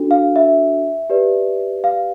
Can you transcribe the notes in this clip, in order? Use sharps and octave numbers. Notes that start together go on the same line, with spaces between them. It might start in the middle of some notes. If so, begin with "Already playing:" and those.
Already playing: D4 F#4 A4
F5
E5
G4 B4 D5
F5